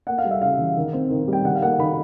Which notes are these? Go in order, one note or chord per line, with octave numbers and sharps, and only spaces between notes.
A#3 F#5
F5
G3
E5
C#3 F5
E3
D#3
C4
D#3
G3 G5
D#3 F#5
F5
A#3 F#5
D#3 B5